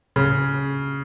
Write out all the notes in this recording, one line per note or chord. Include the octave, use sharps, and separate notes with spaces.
C#3